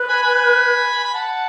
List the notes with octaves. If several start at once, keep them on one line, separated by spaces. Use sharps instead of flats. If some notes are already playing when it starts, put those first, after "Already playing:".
Already playing: B4
G#5 B5
G#5 B5
B5
F#5 A5